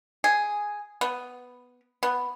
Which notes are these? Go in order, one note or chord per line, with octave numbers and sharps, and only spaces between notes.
G#4
B3
B3